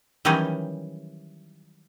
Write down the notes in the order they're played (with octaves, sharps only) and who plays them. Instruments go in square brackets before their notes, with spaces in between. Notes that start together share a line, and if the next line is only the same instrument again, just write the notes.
[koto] D#3 E3 F#3 G3 C#4 D#4